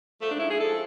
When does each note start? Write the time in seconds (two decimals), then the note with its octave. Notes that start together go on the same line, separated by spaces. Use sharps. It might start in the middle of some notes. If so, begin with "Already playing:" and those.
0.20 G#2 F3 A3
0.29 D4
0.39 E4
0.50 G#4
0.60 F3 A4